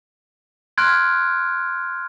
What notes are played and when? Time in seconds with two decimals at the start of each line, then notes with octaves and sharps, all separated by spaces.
0.77 C6 F6 F#6 G#6 D7